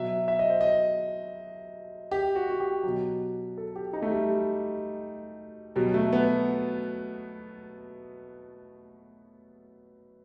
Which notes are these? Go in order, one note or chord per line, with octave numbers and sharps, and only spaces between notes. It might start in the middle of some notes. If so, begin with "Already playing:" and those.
Already playing: B2 F#3 E5
E5
D#5
C5
D#5
G4
F#4
F#4
G4
B2 F#3
A4
G4
D#4
A3
G3
G3
B2 F#3 G3
A3
B3